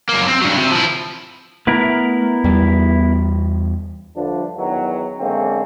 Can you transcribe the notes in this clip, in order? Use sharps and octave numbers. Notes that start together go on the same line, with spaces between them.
F#2 A#3
C4
G2 F#3
C3
F3 E4
A3 B3 E4 A#4
E2 G3
G2 D3 F3 A3 D4
E2 D#3 F#3
F#2 D3 G#3 A#3 C4 C#4